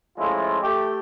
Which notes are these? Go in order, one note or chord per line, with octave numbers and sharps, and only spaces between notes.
F3 G#3 A3 C#4 E4 F4
A3 G4